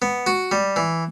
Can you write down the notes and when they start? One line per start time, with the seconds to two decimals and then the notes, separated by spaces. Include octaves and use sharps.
0.02 B3
0.27 F#4
0.52 G3
0.76 E3